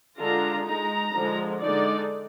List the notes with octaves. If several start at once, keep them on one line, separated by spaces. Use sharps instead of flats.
D3 G#3 D4 F4 A#5
G#3 D#4 A#5
D3 F3 G#3
D3 G#3 D#4 D5